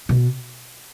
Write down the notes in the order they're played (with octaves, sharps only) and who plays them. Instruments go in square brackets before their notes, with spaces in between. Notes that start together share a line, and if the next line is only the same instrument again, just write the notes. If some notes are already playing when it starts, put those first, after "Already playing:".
[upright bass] B2